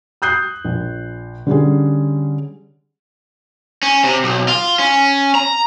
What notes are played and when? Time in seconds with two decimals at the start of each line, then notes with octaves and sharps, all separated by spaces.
0.22 D#6 F#6 G6 C7
0.64 A#1
1.47 D3 G3 C#4 G#4
3.83 C#4
4.04 C3
4.24 B1
4.48 F4
4.79 C#4
5.35 A#5